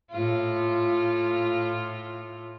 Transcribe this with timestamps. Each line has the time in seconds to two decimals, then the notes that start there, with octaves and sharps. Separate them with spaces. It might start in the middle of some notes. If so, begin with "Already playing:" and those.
0.11 A2 F4